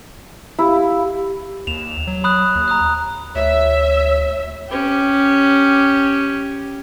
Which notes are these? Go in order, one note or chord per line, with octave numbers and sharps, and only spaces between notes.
E4 G4 F5
D#2 E7 F7
F#3
B5 D#6 F#6
D#2
A#5 D#6 F#6
D2 C#5 E5
C#4 G4